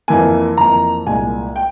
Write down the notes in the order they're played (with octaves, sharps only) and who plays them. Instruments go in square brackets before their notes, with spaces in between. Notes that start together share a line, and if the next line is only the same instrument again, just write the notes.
[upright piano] F2 E3 A#3 G#5
F2 E3 A#3 A#5
C2 A#2 G#3 G#5
G5